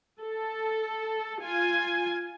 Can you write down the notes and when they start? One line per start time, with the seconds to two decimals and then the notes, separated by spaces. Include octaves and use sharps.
0.21 A4
1.42 F4 G#5